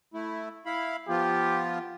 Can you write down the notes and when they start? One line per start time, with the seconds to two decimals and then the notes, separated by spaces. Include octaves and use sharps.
0.14 A3 E4
0.66 E4 F5 B5
1.08 F3 B3 F4 G4